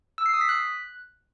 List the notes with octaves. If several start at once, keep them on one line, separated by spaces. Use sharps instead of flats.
E6
C7
D#6
B6
F#6